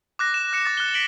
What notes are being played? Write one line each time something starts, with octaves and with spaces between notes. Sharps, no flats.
D6 F#6 A#6
E7
F#6 C#7 E7
D6 A6
F#6 G7
B6 D7 F#7 G7